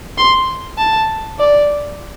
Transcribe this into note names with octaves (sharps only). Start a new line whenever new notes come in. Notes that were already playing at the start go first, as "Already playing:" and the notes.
C6
A5
D5